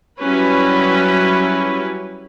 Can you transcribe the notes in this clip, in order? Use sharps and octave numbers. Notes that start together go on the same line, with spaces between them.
F#3 G3 C#4 E4 B4